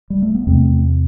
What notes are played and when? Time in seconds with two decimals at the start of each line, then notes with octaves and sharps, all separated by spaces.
0.10 G3
0.22 A3
0.35 B3
0.47 E2 C3 A3 C4